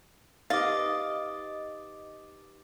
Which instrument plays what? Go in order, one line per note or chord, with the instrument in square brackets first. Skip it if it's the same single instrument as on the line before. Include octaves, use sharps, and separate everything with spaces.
[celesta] D#4 G4 B4 [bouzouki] D#5 [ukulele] F5 [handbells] D6 A6